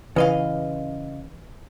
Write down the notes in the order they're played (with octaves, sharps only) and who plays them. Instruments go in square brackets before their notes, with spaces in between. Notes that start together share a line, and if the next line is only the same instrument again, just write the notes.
[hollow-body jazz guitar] C#3 D#5 F5 [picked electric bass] E3 [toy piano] B4